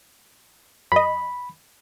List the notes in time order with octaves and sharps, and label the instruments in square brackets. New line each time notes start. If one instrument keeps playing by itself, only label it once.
[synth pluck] F#2 D#5 [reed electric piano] B5